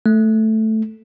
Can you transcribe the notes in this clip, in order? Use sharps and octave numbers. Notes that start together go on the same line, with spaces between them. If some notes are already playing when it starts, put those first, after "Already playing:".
A3